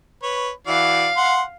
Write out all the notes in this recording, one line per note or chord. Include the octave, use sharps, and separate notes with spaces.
B4 C#5
E3 F#4 D5 F5
F#5 C6